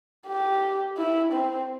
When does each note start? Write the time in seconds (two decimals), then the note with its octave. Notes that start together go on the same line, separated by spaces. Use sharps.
0.27 G4
0.97 E4
1.33 C4